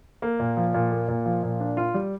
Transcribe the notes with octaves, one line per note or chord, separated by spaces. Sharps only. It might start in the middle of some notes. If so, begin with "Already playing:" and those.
A#3
A#2
F3
A#2
A#3
A#2
F3
A#2
D4
F4
G3